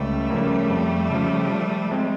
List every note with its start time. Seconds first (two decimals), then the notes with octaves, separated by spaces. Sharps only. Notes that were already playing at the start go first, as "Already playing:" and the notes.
Already playing: C#2 G3 A3
0.30 C#3 F3 A#3
0.70 F2
1.10 C#3 F3
1.51 F3
1.91 G#3 C4